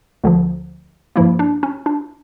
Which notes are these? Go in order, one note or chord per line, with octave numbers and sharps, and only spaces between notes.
D2 D3 F3
G2 F3 A#3 E4
D4
C#4
D4